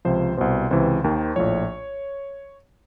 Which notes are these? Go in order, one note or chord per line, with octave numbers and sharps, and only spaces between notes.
C#2 C3 F3 C5
C2 B2 C5
C#2 C3 E3 C5
D#2 D#3
A#1 A2 F3 C#5